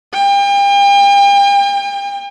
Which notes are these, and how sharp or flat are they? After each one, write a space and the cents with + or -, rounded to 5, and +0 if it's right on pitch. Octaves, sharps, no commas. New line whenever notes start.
G5 +40